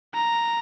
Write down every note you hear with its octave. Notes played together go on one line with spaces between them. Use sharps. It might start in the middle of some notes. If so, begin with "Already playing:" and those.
A#5